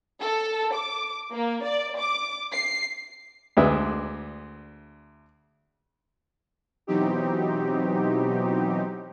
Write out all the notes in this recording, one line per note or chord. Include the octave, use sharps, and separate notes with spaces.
A4
D6
A#3
D5
D6
C7
D2 G#3 D4 B4 E5 D#6
B2 E3 F#3 C4 D#4 G4